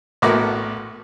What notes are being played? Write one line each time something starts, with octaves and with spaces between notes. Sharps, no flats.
A#1 A2 A#3 B3 F#4 D6